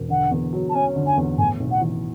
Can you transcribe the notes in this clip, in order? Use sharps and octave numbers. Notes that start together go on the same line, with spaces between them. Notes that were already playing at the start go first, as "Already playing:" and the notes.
Already playing: E1
D3 F#5
E2
F#3
A5
C#4 G#5
D3
G#5
E2
A2 G#5
B1
F#5
E3